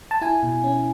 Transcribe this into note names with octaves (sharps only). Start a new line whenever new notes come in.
A5
E4 G#5
B2
C#4